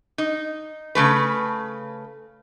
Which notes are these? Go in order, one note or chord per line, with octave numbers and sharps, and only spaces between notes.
D#4
C#3 F3 A3 B4